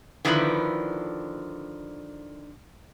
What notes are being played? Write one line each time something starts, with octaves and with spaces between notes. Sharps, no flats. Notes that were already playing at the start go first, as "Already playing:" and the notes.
D3 D#3 F3 D4 E4 B4